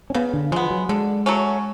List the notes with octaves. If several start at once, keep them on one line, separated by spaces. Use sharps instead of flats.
C#4
C#3 B3
D3
F3 G#3 B3
F#3
D3 G#3
F#3 A3 C#4